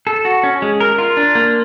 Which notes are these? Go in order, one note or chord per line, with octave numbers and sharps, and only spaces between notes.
A4
F#4
C#4
G#3
A#4
F4
D4
A#3